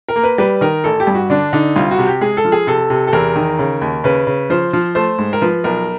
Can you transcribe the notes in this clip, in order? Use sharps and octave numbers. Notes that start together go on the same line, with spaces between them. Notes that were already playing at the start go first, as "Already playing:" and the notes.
A#4
A#3
B4
G3 B4
D#3 A#4
A1 A4
G4
G2
F#4
D3 D4
D3 D#4
C2 F4
F#4
C3
G4
G#3 G#4
A4
F3
G#4
C3 A4
C3
A4
E2 A#4
D#3
C#3
D#2
C#3 B4
C#3
F3 C5
F3
A3 C5
G#2
A#4
F3 B4
B1 A#4